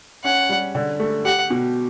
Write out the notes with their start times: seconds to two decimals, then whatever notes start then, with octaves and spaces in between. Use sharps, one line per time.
0.24 C#4 F#5
0.49 G3
0.75 D3
1.00 A3
1.25 G4 F#5
1.50 B2